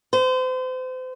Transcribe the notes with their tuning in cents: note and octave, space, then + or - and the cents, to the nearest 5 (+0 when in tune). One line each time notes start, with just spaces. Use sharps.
C5 -35